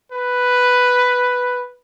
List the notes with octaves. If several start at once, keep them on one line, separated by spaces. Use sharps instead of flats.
B4